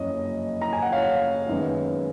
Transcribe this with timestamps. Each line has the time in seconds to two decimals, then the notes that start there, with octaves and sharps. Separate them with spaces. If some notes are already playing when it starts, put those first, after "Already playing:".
Already playing: F#1 F2 C#3 F#3 C#5 D#5
0.61 A#5
0.73 G#5
0.82 F#5
0.92 C#5 F5
1.49 F#2 D#3 G#3 B3